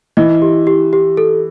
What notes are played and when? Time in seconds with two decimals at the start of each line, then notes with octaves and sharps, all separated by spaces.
0.17 E3 D#5
0.42 G4
0.67 G4
0.93 G4
1.17 A4